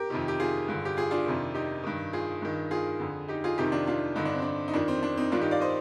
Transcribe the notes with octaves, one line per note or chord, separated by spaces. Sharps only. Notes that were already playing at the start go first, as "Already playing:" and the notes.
Already playing: G4 A#4
F2 C3 D#3
G4
F4 G#4
G2 D3
G4
F4 G#4
D4 F4
F2 C3 D#3
D#4 G4
G2 D#3
F4 G#4
G2 D#3
F4 G#4
F2 D3
D#4 G4
F4 G#4
F2 C3 D#3 D#4 G4
D4 F4
D4 F4
G2 D3 D#4
D4
C4
D4
D#4
F2 D#3 D4
C4
D4
C4 D#4
G2 D#3 D4 F4
D#4 G4
D5 F5
C5 D#5